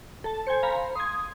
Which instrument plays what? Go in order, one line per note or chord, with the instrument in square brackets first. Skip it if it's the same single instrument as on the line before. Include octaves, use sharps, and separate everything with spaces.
[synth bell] A4 A5
[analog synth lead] C5 [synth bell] G#5 G6 C#7
[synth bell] F5 A#5 B5
[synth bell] C6 G#6 [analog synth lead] D#6